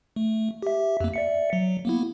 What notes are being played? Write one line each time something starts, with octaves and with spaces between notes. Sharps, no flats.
A3
G4 E5
F2 A#3
D5 E5 C#7
F#3
A#3 B3 E4